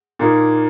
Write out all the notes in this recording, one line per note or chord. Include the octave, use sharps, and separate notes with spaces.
A#2 A#3 D#4